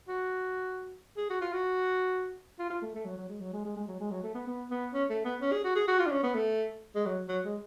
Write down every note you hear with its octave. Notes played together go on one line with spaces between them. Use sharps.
F#4
G#4
F#4
F4
F#4
F4
F4
A3
A3
F#3
F#3
G#3
F#3
G#3
G#3
G#3
F#3
G#3
F#3
A3
B3
B3
B3
C#4
A3
B3
C#4
G#4
F#4
G#4
F#4
F4
D4
C#4
B3
A3
G#3
F#3
F#3
G#3